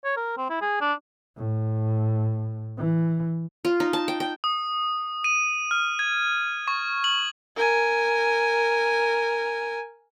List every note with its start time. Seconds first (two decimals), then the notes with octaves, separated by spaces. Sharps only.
0.04 C#5
0.17 A#4
0.37 C4
0.50 E4
0.61 G#4
0.81 D4
1.37 A2
2.78 E3
3.65 F4
3.80 D#4
3.93 A5
4.08 G5
4.20 G5
4.44 D#6
5.24 D#7
5.71 F6
5.99 G#6
6.68 C#6
7.04 F#7
7.56 A#4 G#5